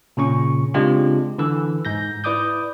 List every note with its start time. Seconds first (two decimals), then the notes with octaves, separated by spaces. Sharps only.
0.17 A#2 C#3 C#4 C#6
0.74 C#3 G#3 C4 D4 F4 G4
1.38 D3 E3 E6
1.85 G#2 G6 A#6
2.24 E4 B4 D5 D6 D#6 G6